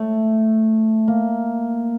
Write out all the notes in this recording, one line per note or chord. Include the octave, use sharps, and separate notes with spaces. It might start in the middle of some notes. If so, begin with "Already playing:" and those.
Already playing: A3
A#3